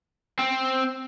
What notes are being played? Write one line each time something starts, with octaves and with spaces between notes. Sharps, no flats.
C4